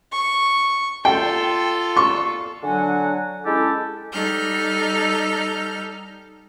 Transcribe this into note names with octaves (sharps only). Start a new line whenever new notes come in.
C#6
F4 A4 G5
C#6
D3 F#3 D4 F#4 F#5 G#5
G#3 C#4 E4 G4 A4
G3 D#4 A4 F6 G6